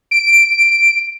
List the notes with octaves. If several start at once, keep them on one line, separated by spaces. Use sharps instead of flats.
D7